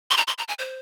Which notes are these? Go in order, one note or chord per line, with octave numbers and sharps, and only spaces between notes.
C6
A#5
C6
A#5
G#5
C5